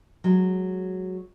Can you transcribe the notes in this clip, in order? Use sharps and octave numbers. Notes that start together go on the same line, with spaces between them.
F#3 G#3